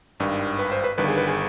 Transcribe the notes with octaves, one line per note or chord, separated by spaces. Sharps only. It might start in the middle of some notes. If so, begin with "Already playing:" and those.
G#1 G2 D#3
B4
C5
B4
G1 G2 D#3 B4
G#4
B4
G#4